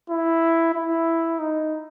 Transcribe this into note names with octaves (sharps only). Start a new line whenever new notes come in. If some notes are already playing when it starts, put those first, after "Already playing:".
E4
E4
D#4